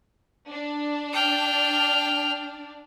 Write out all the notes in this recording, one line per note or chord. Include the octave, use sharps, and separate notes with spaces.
D4
G5 F6